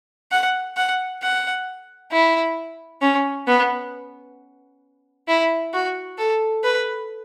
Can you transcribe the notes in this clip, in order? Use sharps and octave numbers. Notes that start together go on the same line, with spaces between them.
F#5
F#5
F#5
E4
C#4
B3
E4
F#4
A4
B4